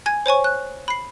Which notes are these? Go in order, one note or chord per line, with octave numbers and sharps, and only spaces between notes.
G#5 G#6
C5 C#5 G#5 C#6
F#6
B5 C7